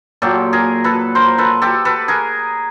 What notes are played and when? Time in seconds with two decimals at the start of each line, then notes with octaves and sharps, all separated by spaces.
0.22 A#2 F#3 G4 A4
0.53 G#4 A#4
0.84 A4 B4
1.15 A#4 C5
1.38 A4 B4
1.62 G4 A4
1.85 A4 B4
2.08 G#4 A#4